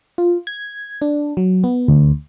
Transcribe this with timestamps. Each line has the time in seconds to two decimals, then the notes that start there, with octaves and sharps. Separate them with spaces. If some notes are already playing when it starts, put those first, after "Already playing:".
0.18 F4
0.47 G#6
1.02 D4
1.37 F#3
1.64 B3
1.88 D2